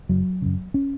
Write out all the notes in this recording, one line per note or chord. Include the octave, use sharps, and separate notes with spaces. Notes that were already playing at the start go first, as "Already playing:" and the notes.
F#1 F#3
F#2 C#3
C#4